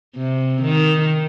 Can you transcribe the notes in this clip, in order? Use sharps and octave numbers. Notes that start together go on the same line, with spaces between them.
C3
D#3